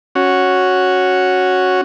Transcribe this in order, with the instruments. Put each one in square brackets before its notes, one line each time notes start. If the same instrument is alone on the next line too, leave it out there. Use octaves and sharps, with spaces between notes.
[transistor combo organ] C#4 F#4